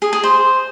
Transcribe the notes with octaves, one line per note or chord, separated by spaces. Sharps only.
G#4
G#4
C5